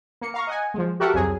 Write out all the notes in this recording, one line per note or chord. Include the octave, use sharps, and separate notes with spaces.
A#3 C#7
F5 A#5 C#6
D#5 F#5 G#5
F3 G#3
F#4 G4 A4 A#4 E5 F#5
C2 F2 F#3 G#4